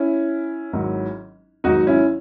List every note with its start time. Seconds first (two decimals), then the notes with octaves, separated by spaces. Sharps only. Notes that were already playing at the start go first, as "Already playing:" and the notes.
Already playing: C#4 E4
0.73 G#1 G#2 F#3
1.64 G#1 G#2 F#3 D#4 F#4
1.87 C#4 E4